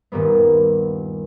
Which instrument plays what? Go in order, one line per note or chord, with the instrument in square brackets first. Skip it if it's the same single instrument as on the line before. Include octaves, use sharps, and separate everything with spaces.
[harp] D#1 G2 A#3 B3